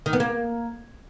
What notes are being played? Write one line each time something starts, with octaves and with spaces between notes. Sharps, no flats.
D#3
B3
A#3